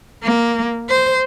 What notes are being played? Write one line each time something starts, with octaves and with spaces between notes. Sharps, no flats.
A#3
C5